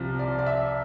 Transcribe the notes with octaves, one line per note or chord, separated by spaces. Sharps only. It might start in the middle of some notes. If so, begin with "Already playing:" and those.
Already playing: C2 C3 F3
D5
D5
E5